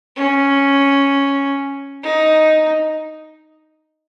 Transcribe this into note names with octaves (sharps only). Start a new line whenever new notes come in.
C#4
D#4